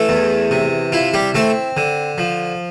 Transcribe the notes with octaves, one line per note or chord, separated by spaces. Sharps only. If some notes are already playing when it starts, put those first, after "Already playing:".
Already playing: E3 A3 A4
E2
C3
E4 F4
G3 G4
A3 C4 A4
D3
F3